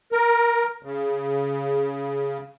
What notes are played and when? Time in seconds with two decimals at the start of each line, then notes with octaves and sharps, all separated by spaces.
0.12 A#4
0.83 C#3